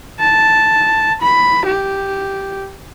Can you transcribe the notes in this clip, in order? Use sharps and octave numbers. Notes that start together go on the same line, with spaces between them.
A5
B5
G4